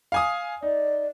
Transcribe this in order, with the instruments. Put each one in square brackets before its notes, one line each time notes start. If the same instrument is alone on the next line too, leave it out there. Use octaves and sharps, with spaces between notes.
[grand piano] F5 G#5 D#6
[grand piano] D#4 [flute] D5